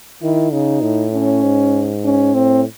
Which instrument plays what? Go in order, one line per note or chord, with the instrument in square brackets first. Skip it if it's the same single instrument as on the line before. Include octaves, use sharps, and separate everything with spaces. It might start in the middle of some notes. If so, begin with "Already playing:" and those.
[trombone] D#3 [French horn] E4
[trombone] C#3 [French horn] D#4
[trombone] A2
[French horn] C#4
[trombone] G#2
[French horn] C#4
[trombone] A2 [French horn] C4